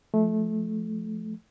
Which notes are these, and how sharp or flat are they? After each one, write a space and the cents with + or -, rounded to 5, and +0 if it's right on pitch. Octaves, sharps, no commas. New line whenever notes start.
F3 +0 A3 -20